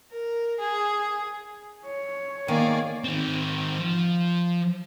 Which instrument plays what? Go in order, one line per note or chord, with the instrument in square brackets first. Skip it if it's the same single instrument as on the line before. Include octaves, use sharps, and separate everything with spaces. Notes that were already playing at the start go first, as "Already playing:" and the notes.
[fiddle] A#4
G#4
[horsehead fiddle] C#5
[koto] D#3 [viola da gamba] A#3 [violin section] G#4 D5 F5
[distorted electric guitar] D#3 C4
F3